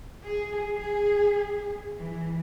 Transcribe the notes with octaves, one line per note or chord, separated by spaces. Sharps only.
G#4
G#4
E3